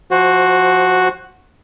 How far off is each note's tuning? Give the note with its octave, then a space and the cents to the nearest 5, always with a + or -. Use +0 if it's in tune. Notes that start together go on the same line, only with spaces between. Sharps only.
F3 +0 F#4 +0 C5 +25